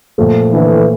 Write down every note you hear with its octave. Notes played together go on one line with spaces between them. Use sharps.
A#2 F3 A3
D3 E3